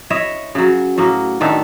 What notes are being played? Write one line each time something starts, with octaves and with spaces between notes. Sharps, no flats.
E4 C#5 D#5 E5
C#3 F#3
A2 F#3 A#3
A2 D#3 D4 E5